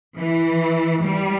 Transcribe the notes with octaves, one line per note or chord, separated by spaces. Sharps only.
E3
G3